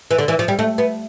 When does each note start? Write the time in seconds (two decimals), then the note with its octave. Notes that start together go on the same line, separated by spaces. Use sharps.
0.11 E3
0.18 D3
0.28 E3
0.39 F3
0.48 G3
0.59 A3
0.78 B3